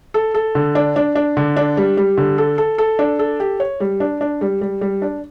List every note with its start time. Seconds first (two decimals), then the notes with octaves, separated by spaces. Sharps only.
0.14 A4
0.34 A4
0.55 D3
0.75 D4
0.96 D4
1.16 D4
1.37 D3
1.57 D4
1.77 G3
1.97 G3
2.17 D3
2.38 A4
2.58 A4
2.78 A4
2.99 D4
3.19 A4
3.40 G4
3.60 C#5
3.80 G3
4.00 D4
4.21 D4
4.41 G3
4.61 G3
4.81 G3
5.02 D4